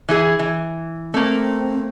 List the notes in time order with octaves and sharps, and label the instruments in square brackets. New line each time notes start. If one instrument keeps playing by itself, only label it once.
[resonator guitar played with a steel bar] E3 E4 G#4
E3
[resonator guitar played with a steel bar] A3 A#3 [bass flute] C4